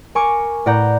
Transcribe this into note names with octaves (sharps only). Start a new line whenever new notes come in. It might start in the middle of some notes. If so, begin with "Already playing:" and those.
A#4 G#5 C#6 D6
A2 B4 D5 F#5 A#5 G6